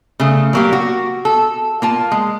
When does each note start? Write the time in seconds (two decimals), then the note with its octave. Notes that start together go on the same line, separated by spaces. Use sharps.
0.20 C#3 A3
0.53 F#3 A#3 G4
0.73 F#4
1.25 A4
1.82 A#3 F4 A5
2.11 G#3